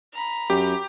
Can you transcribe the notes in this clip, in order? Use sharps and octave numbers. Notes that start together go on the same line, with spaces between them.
A#5 B5
F#2 G4